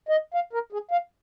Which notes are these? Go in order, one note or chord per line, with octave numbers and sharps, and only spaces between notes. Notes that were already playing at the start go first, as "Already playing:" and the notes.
D#5
F5
A#4
G#4
F5